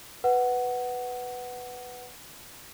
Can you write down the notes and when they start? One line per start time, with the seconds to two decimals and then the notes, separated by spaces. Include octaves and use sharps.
0.24 B4 F#5